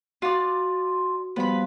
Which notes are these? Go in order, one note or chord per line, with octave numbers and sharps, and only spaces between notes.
F4 F#4 D5
F3 G3 B3 B4 B5